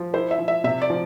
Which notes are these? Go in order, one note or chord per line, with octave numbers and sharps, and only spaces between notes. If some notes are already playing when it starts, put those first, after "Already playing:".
Already playing: F3
E4 C5
E5
F3
E5
C3 E5
D5
F3